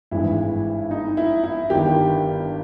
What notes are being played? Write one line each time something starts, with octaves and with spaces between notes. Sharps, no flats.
G#1 G2 E3 G#3 E4
D#4
E4
E4
G1 G2 D#3 G4